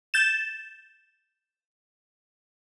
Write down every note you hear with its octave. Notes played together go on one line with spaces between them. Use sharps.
G6 A6 E7